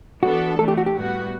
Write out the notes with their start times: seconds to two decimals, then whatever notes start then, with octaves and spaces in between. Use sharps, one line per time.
0.23 E3 B3 D4 F#4 A4
0.59 E3 A3 D4 A4
0.68 G4
0.77 F#4
0.86 G4
0.96 A2 G3 B3 F#4